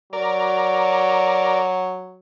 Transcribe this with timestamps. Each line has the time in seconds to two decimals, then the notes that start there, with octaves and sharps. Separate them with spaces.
0.13 F#3 A#4 D5